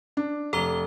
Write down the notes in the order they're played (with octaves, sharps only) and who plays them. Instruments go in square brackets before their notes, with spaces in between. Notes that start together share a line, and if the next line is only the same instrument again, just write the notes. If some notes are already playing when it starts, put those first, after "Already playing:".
[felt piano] D4
[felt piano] F1 [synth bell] A4 A#5 G7